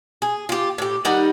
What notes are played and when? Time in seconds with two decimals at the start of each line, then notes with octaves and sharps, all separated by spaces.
0.22 G#4
0.49 F4 G4
0.78 A2 G4
1.05 D#3 G3 D#4 F#5